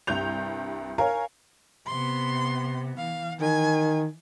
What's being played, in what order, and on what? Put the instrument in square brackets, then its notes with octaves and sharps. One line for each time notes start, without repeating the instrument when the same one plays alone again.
[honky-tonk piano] C2 G2 G6 F7
A#4 C#5 F5 G#5
[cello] C3 B3 [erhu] C6
[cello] E3 [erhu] F5
[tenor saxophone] D#3 [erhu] G#5